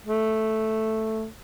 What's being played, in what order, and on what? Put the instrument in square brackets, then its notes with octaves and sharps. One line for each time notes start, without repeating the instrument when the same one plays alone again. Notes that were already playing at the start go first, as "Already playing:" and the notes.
[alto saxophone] A3